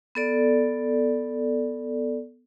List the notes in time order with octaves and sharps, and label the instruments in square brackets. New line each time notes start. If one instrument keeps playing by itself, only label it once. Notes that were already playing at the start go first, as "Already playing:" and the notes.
[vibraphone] B3 A4 D5